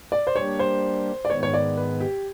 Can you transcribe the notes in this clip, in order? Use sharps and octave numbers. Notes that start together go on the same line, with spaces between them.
D5
C5
G3 A#3 D4 G4 C#5
C5
D5
G#2 D#3 G#3 B3 C#5
C#5
D5
B4
G4